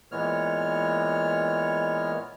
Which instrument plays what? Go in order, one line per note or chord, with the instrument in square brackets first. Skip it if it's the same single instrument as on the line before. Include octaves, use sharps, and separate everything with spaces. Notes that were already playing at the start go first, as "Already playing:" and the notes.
[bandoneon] A#2 E3 G#3 B3 C#5 F6